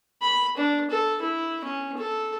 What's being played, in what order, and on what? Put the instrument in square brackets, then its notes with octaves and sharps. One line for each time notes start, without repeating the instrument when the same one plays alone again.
[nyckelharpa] B5
D4
A4
E4
C#4
A4